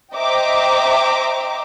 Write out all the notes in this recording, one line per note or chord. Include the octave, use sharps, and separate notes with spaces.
C5 D#5 E5 G5 A#5 D6